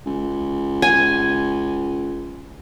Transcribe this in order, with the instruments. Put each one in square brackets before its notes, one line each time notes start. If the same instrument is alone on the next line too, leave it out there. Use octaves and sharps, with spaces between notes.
[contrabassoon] C#2
[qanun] G#5